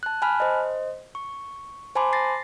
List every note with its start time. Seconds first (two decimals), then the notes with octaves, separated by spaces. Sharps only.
0.03 A5 F#6
0.22 G#5 A5 B5 F6 F#6
0.40 C5 D#5
1.15 C#6
1.95 C5 G#5 A5 B5 C6 D6
2.13 A6 A#6 C7